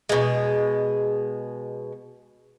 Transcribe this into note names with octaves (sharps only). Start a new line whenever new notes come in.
B2 G#3